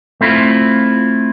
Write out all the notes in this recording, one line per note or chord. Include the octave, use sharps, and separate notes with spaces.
A3 C4 E4 F4